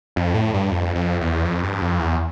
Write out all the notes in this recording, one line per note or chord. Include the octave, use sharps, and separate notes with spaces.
F2
A2
G2
F2
F2
E2
F2
G2
F2
E2